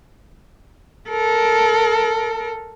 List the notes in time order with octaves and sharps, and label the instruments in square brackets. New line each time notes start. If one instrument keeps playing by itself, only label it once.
[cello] A4 A#4